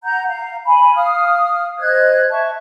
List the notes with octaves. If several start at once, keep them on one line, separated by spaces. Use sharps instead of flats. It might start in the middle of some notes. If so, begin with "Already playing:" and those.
F#5 A#5 G6
F5 A#5
G#5 B5
F5 D#6 F6
C5 D#5 F#6 G#6
E5 A5 C#6